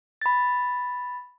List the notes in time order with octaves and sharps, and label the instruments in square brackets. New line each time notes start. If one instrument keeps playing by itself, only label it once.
[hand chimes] B5 A6